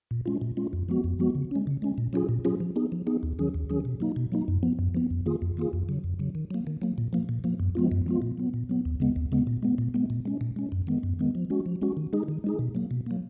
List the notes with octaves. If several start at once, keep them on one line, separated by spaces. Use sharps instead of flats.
A#2
G#3 C#4 F4
A#2
G#3 C#4 F4
F2
F3 G#3 B3 F#4
F2
F3 G#3 B3 F#4
C#3
G#3 C#4
C#3
G#3 C#4
A#2
F#3 C#4 F4 G#4
A#2
F#3 C#4 F4 G#4
F3
B3 D#4 G#4
F3
B3 D#4 G#4
D#2
D#3 F#3 C#4 G#4
D#2
D#3 F#3 C#4 G#4
B2
F#3 A#3 D#4
B2
F#3 A#3 D#4
F#2
F3 B3
F#2
F3 B3
F2
D#3 A#3 F4 G#4
F2
D#3 A#3 F4 G#4
F2
C#3 F#3
F2
C#3 F#3
D#3
F#3 A#3
D#3
F#3 A#3
A#2
F3 A#3
A#2
F3 A#3
F#2
F3 G#3 B3 F4
F#2
F3 G#3 B3 F4
A#2
F#3 B3
A#2
F#3 B3
D#2
C#3 G#3 B3
D#2
C#3 G#3 B3
A#2
G#3 B3
A#2
G#3 B3
A#2
G#3 C#4
A#2
G#3 C#4
F#2
D#3 G#3 B3
F#2
D#3 G#3 B3
F3
G#3 C#4 F#4
F3
G#3 C#4 F#4
D#3
G#3 D#4 G#4
D#3
G#3 D#4 G#4
B2
F#3 A#3
B2
F#3 A#3